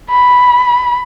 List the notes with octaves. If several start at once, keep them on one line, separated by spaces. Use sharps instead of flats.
B5